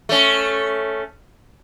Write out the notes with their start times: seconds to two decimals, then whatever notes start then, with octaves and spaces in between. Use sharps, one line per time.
0.09 A3 C#4